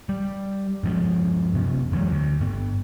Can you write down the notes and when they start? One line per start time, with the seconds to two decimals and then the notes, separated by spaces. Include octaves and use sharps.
0.09 G3
0.84 G2 F3 G#3
1.53 F#2 C3 B3
1.92 F1 E3 F#3 G#3
2.10 D2
2.41 G2 B3